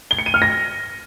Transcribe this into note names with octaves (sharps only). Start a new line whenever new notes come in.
G7
C#7
D#7
F6
A#6